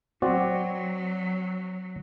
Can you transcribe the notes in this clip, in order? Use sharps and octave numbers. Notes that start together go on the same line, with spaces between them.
F#3 C4 F#4 D5